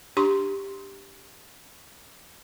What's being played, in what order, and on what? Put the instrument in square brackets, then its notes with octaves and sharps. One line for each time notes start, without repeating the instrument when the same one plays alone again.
[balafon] D4 G4 C6 C#6